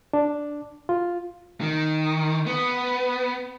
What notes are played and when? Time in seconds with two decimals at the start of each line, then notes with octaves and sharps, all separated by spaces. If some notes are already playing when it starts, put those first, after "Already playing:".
0.13 D4
0.89 F4
1.61 D#3
2.47 B3